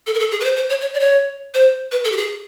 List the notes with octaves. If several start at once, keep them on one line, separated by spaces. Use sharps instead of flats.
A4
A#4
A4
G#4
B4
C5
C5
C#5
C#5
D5
C#5
C5
B4
A4
G4
G#4